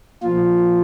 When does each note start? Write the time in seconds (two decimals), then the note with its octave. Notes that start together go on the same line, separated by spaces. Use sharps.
0.23 A#2 F3 F4